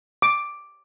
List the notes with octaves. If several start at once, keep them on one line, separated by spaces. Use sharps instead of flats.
D6